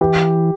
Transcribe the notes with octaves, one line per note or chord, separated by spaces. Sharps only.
E3 G4